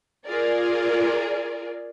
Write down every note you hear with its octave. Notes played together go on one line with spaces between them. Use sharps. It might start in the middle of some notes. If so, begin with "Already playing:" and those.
F4 G#4 A#4 D5